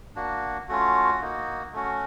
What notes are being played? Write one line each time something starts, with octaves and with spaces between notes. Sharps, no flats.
A#3 D4 F#4
A3 C#4 F4 F#4
A#3 D#4 F#4
A3 C#4 F#4